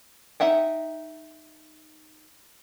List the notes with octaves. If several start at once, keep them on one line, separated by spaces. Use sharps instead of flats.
D#4 E5 F#5 G5